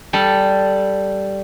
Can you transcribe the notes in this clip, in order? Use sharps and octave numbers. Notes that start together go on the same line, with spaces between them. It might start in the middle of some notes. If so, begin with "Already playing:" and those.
G3 A4